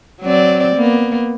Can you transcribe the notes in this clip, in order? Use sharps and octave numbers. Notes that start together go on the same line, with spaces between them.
F#3 C4 D5
A#3 B3